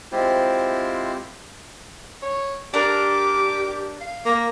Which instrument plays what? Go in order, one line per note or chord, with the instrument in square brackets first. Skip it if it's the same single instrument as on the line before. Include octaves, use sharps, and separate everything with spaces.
[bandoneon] G#3 C4 E4 F4 G4 C5
[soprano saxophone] C#5
[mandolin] D4 A#4 [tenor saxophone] G4 [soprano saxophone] D6
[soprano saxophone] F5
[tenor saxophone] A#3